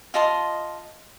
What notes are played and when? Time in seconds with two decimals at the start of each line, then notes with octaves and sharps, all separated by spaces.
0.14 F4 D#5 A5 C6